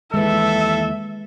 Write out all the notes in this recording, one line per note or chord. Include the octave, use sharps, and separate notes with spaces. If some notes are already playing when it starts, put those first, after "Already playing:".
D#2 E3 G#3 A4 B4 E5